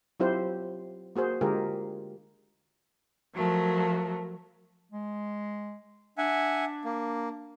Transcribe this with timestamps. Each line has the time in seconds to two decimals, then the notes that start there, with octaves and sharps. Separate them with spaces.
0.20 F#3 C4 E4 F4 G4 C5
1.16 A#3 F#4 G#4 C5
1.41 D3 G#3 F4 G4 G#4 A#4
3.35 F3 F#3 A3 A#4
4.91 G#3
6.18 D4 E5 F#5 G#5
6.85 A#3